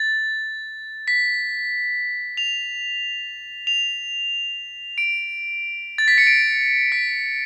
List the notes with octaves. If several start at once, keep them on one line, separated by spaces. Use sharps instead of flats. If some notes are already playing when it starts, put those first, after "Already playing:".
Already playing: A6
B6
F7
F7
D7
A6
B6
C#7
D7
B6